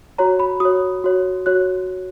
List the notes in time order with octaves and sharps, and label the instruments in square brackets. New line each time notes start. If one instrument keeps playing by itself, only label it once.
[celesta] F#4 C#5 A#5
B5
F#4 C#5 D#6
F#4 C#5
F#4 C#5 F#6